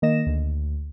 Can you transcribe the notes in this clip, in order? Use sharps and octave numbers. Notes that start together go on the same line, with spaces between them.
D#3 A#3 D#5 A#6 E7
D2